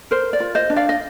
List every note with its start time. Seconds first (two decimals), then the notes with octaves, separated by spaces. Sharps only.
0.11 A#4 C5
0.33 D5
0.40 F4
0.55 C5 D#5
0.70 D4
0.76 D5 F5
0.89 D#5